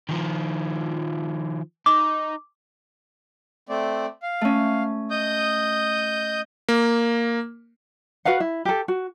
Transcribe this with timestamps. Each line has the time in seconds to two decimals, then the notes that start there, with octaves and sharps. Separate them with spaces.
0.09 D#3 F3
1.86 D#4 D6
3.69 A3 C4 D5
4.22 F5
4.41 A3 C#4
5.11 D#5 D#6 G6
6.69 A#3
8.25 F#4 B4 F5 F#5
8.40 E4
8.65 G4 A4
8.88 F#4